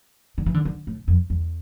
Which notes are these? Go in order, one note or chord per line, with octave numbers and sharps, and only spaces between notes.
D3
E3
D3
D3
A2
F2
E2